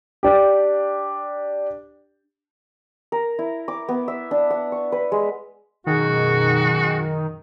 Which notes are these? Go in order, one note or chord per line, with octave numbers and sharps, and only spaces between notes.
D4 G4
A#4
E4
D6
B3
E5
D4
F#5
C#6
B4
G#3
F#2 B2 D#3 F#4 G#4